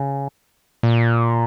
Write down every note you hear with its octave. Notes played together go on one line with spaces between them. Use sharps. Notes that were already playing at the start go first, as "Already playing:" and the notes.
Already playing: C#3
A#2